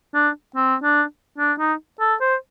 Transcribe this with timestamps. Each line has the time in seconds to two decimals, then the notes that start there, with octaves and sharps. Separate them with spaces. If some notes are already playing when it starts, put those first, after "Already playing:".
0.14 D4
0.56 C4
0.83 D4
1.38 D4
1.58 D#4
2.00 A4
2.21 C5